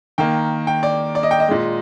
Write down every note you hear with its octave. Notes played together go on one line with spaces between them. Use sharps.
D#3 A#3 G5
G5
D5
D5
D#5
G5
D#5
A#2 G#3